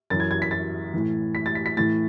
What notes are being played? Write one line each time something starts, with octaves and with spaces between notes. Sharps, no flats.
F#2 E3 A6
G#6
G#6
B6
A6
A2 E3
B6
A6
B6
B6
A2 E3 A6